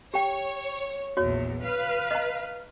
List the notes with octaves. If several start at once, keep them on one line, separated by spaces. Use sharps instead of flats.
G4 C#5 G5
A#1 E2 F#4 C#5
B4 F5
D#5 A#5